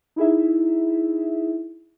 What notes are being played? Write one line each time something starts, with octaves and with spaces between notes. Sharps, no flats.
D#4 E4 G#4 E5